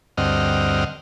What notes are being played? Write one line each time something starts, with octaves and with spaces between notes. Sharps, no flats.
D2 G2 C4 D#5 F#5 F6